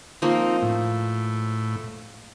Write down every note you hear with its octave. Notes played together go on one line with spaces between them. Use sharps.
F3 A#3 C4 D#4
A2